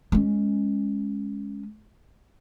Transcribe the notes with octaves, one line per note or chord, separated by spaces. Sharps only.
G#3 C#4